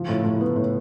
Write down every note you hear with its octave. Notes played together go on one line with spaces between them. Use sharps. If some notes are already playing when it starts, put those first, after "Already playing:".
Already playing: F3
A2
A2
B3
A2